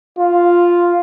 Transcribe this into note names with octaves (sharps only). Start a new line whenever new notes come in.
F4